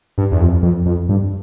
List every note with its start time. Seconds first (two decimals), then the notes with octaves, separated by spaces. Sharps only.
0.18 G2
0.32 E2
0.41 F2
0.63 F2
0.86 F2
1.09 G2